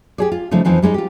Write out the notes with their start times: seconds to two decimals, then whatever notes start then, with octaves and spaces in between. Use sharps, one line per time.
0.18 G4 G#4 D5
0.32 F4
0.51 C#3 F3 G3 A3 D#4
0.65 F2 E3 F3 C4 D#4
0.82 G3 G#3 C#4 D#4
0.94 F4 G4